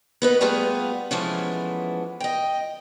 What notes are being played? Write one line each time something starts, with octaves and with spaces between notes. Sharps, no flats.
B3 D#4 B4
G3 A3 B3 F4 G#4
E3 F3 G#3 A3 B3 C#4
D#5 G5